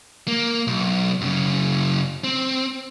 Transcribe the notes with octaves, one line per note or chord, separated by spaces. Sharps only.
A#3
B1
F#2 C#3
C4